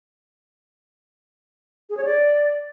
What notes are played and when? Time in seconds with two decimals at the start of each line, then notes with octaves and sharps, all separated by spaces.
1.90 G#4
1.97 C#5
2.05 D5